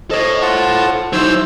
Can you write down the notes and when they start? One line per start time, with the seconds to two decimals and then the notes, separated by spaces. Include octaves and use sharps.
0.11 A4 C5 C#5 D#5
0.42 F4 F#5 A5
1.13 F#3 D#4 E4 C5 E6